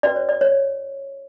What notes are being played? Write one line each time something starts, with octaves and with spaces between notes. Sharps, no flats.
C#4 F#4 B4 D5
C#5
D5
C#5